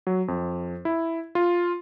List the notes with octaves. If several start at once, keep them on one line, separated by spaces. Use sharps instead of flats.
F#3
F2
E4
F4